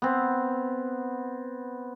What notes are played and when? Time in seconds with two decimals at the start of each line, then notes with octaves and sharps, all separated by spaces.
0.02 B3 C4